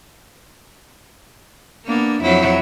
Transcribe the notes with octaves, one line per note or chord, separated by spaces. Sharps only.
A#3 B3 D4
F2 F#3 E4